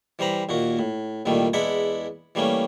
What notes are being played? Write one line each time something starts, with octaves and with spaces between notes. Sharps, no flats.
E3 G3 C5 A#5 B5
D#2 A#2 F#4
A2
C2 A#2 D#3 G3 A3
E2 G#3 D4 E4 F#5 B5
E3 G3 A3 A#3 C#4